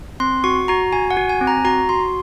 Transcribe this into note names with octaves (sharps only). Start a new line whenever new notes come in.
C4 C6
F#4 C#6
F#4 A#5
F#4 G#5
F#5
F#4
G#5
C4
A#5
F#4 A#5
F#4 C6